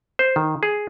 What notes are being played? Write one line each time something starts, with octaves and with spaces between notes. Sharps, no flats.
C5
D#3
G#4